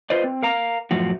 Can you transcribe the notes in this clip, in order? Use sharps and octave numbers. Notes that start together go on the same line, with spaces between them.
F4 B4 C5 D5 D#5
C4
A#4 F5 A#5
F#2 A2 F3 F#4